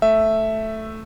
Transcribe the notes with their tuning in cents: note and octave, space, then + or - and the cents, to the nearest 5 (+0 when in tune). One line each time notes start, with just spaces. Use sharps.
A3 +0 E5 +0